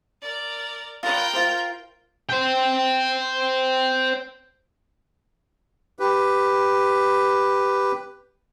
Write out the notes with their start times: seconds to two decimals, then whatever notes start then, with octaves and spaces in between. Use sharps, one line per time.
0.22 A#4 D5
1.03 F4 A#4 B4 G5
1.33 F4 C5
2.29 C5 G5
5.99 G4 B4